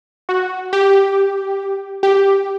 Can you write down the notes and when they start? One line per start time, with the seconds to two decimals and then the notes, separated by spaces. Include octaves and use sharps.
0.29 F#4
0.73 G4
2.03 G4